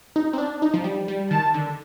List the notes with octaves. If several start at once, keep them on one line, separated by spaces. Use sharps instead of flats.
D#4
C4
D4
D#4
F3
G3
G3
D#3 A5
D3